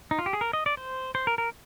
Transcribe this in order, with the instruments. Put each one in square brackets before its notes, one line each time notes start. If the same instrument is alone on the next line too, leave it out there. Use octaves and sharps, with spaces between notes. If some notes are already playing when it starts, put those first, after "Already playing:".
[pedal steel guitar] D#4
F4
G4
G#4
A#4
D#5
D5
C5
C5
A#4
A#4